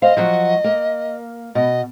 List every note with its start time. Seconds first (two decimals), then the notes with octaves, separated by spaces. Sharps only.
0.02 C5 D#5 F5
0.17 F3 F#3 F#4
0.64 A#3
1.55 B2 D#5